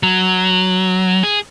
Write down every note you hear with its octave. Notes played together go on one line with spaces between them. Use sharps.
F#3
G#4